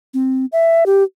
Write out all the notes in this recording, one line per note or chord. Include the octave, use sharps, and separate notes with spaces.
C4
E5
G4